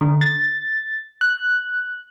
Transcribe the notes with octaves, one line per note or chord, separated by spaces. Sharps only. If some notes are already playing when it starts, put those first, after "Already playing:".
D3
A6
F#6